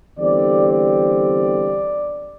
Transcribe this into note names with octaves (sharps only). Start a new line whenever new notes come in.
E2 D3 G3 C4 D5
D5